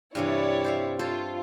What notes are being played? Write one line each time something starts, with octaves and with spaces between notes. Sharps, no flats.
G2 C3 E3 E4 C#5 D5
C5 E5 F5
F4 A4 C5 C#5